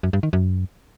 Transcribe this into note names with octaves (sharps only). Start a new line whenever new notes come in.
F#2
G2
D#3
F#2